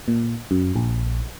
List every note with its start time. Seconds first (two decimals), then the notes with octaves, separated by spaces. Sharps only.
0.08 A#2
0.51 F#2
0.76 A#1